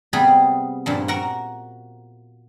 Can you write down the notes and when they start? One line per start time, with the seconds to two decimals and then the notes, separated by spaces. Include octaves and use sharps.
0.13 C3 G3 B3 G#4 B5
0.86 G2 A#2 F3
1.08 F#4 A#4 F#5